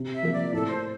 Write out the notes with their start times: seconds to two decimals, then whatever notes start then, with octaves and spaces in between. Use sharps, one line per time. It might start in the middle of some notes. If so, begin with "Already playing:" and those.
Already playing: C3
0.13 E5
0.23 F3 A#3
0.33 D5
0.53 A2 A4
0.68 C5